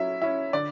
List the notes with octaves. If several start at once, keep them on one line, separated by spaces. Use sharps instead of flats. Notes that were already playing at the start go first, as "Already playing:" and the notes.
Already playing: F#3 C#4 E4 E5
C#4 E4 E5
D3 D5